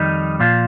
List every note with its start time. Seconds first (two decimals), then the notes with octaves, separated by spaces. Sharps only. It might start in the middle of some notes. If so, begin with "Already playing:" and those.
Already playing: F2 D#3 G3 D#4
0.40 A#2 F3 F4